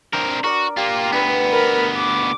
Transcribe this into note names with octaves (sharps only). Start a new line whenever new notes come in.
C4 D4 A#4
F#4 A#4 D5
A#3 F4 G4
D2 B3 D4 B4
A#4 B5
D6